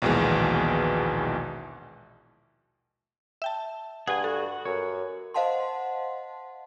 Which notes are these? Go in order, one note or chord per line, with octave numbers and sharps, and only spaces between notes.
A#1 D#2 B2 E3 G#3
E5 G5 A5
G2 G#4 F#5 G#5
F#4 A4
F#2 C#5
C5 D#5 F5 F#5 A5 C6